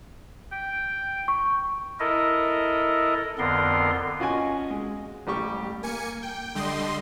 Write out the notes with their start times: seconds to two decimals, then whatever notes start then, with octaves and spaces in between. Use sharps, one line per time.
0.52 G5
1.28 C#6
2.00 E4 A4 A#4 D#5
3.39 F2 D3 B3 A#4 C6
4.20 C#4 F4 F#4 C#5 D#5 G#5
4.70 G#3
5.27 A1 G3 G4 C#6
5.83 A#3 G#5 C#7
6.22 G5
6.55 D3 G3 D#5 C6